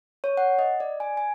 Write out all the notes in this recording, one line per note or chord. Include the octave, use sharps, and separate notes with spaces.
C#5
F#5
D#5
D5
G#5
G#5